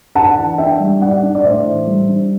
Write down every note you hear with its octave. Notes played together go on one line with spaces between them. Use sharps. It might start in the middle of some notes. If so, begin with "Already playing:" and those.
D4 F#5 A5
E3
D4 E5 G5
G3
D4 D5 F#5
D4
D5
A2 C5 E5
E3
G3
D4